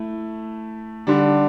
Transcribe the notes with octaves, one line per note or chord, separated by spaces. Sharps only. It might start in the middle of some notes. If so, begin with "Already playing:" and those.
Already playing: A3 E4
D3 G3 D4